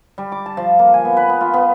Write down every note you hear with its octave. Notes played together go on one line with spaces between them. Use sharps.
G3
D6
A5
F3
A#3
G#5
B3
B4
B3
F4
B3